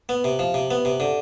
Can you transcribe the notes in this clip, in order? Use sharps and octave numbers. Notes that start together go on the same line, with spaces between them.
B3
C3
F3
C3
B3
C3
D3